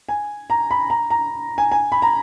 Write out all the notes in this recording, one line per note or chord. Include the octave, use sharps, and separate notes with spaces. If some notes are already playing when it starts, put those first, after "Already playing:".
G#5
A#5
B5
A#5
A#5
G#5
G#5
B5
A#5